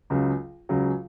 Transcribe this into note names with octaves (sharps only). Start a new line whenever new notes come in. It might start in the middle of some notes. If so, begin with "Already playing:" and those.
C#2 C#3 F#3
C#2 C#3 F#3